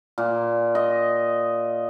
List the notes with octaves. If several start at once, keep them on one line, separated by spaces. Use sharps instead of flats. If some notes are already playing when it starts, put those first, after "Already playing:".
A#2
D#5